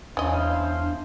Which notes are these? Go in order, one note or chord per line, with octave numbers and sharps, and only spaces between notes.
E2 C#4 D4 E4 C5 D#5 F5